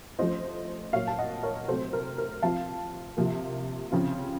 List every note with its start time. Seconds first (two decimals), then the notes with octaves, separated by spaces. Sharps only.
0.19 F3 A3 C#4 F4 C5 D#5
0.93 A#2 F#3 A#3 C#5 F5
1.07 A5
1.18 D#5 F#5
1.43 A#4 C#5
1.68 C3 F#3 A3 C4 A4 C5
1.93 A#4
2.18 A#4
2.42 F3 C4 F4 F5 A5
3.17 C3 F3 A#3
3.91 C#3 F3 C4 F4